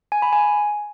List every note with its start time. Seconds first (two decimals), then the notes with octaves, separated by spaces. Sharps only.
0.12 G#5
0.22 B5
0.33 G#5